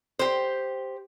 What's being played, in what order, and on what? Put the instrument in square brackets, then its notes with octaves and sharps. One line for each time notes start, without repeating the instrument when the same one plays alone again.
[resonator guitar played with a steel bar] G4 C5